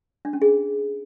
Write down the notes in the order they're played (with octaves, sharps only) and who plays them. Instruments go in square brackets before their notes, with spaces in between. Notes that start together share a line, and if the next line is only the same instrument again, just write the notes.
[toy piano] D4
C#4
G#4